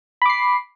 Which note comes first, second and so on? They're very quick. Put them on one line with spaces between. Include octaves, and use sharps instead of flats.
B5 D6 C7